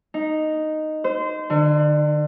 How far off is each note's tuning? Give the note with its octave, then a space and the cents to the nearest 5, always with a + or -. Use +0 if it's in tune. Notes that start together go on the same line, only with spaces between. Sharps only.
D#4 -5
C5 -25
D3 +35